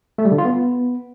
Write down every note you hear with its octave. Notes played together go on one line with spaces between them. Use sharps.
A3
G3
D3
F4
B3